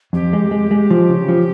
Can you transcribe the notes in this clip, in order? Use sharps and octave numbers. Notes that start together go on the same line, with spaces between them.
F2 G4
G#3
G#3
G#3
F3
C#3
F3